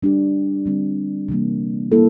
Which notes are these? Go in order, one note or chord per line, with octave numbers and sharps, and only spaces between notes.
G3 D4 G4
D3 G3 C4
C3 E3 G3 A#3
G3 A#3 E4 A4